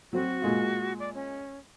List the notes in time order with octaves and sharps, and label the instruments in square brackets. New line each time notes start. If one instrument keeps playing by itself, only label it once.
[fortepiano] F#3 C4 [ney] F#4
[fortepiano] A#2 G#3 F4
[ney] D5
C#4